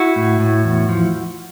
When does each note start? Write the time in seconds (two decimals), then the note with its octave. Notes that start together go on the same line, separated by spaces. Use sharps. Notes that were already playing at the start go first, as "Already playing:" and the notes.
Already playing: E4 F#4
0.16 A2
0.40 A2
0.65 E2
0.89 F3